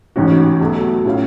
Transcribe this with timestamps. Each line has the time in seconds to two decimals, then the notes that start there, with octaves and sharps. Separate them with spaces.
0.16 A1 G#2 G#3 C#4 F#4
0.61 B1 B2 F#3 A3
1.05 A2 F#3 C#4 F4